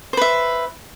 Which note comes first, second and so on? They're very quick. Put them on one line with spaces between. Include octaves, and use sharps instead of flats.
C5 B4 E5